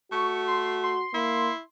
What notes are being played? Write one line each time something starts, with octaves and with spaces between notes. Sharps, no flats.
A3 F#4 C#6
C6
C6
A#3 E4